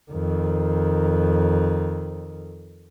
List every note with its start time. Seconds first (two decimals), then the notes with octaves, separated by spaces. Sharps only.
0.12 F2 D#3